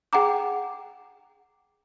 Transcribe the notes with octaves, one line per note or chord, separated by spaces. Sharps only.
G#4 F#5 G5 A#5 D6